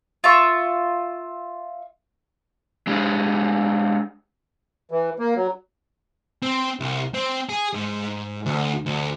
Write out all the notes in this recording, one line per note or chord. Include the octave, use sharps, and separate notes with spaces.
F4 E5 C#6
G#3 D4 G4 G#4
E3
A#3
F#3
C4
C2
C4
G#4
G#2
D2
D2